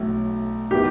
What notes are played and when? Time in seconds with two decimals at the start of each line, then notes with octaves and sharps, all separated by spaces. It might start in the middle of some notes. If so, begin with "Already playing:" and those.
Already playing: B1 A2 F#3 A3
0.71 D#3 G3 B3 E4 G4